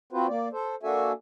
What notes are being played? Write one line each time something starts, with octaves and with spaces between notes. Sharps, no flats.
C4 F4 F#4 B4 C5
A#3 D5
A4 C5
A#3 D4 F#4 A4 E5 G#5